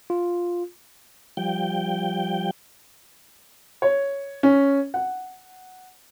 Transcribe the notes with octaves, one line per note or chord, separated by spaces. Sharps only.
F4
F3 G3 G5
C#5
C#4
F#5